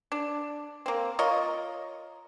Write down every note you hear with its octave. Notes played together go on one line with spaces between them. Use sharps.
D4
A#3 C4
F4 A#4 C#5 D#5